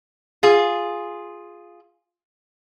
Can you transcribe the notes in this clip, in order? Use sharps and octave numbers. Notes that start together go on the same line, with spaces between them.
F4 G#4